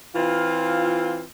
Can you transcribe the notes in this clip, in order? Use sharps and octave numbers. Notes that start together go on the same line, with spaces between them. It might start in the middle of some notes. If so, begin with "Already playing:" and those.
E3 C4 F4